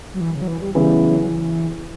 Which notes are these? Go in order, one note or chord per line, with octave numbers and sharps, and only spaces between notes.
F#3
E3
C#3
F#3
E3
G3
C#3 E3 G3 B3 E4
F#3
F#3
E3